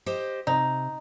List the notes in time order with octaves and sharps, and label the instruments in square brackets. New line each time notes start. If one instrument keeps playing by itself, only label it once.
[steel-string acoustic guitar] G4 C5 D#5
[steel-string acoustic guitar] C3 [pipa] D#4